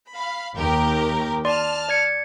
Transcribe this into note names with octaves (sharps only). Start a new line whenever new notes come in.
F5 B5
D#2 G4 A#4
D5 A5 C6 F6
D5 G#6 C#7